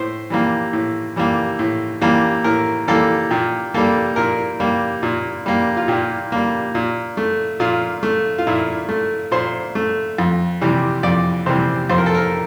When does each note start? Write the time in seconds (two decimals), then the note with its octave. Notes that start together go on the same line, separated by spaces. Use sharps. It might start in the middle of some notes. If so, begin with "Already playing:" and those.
Already playing: A2 C5
0.30 E3 G3 A#3
0.73 A2
1.16 E3 G3 A#3
1.59 A2
2.01 E3 G3 A#3
2.44 A2 A#4
2.88 E3 G3 A#3 A4
3.30 A#2 G4
3.74 G3 A#3 A4
4.16 A#2 A#4
4.60 G3 A#3
5.03 A#2
5.46 G3 A#3
5.77 F4
5.88 A#2 G4
6.32 G3 A#3
6.75 A#2
7.17 A3
7.60 A#2 F4
8.03 A3
8.38 F4
8.47 A#2 E4
8.89 A3
9.32 A#2 C5
9.75 A3
10.18 F2
10.61 C3 E3 G3
11.03 F2 D5
11.46 C3 E3 G3 C5
11.90 F2 C5
11.98 A#4
12.06 A4
12.15 A#4